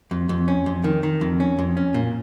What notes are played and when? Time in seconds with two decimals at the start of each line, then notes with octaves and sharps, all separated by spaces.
0.11 F2
0.29 F2
0.48 C#4
0.66 F2
0.84 D#3
1.03 D#3
1.21 F2
1.40 C#4
1.59 F2
1.77 C#4
1.94 A#2